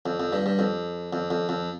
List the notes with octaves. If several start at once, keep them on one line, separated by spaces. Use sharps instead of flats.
F2
F2
G2
G2
F2
F2
F2
F2